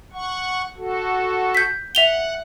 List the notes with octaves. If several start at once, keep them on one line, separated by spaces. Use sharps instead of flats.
F#5 C#6
F#4 A4
G6 B6
E5 F#5 F7 G7